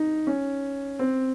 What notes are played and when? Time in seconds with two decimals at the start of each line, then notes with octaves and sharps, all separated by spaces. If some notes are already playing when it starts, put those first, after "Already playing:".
Already playing: D#4
0.27 C#4
0.99 C4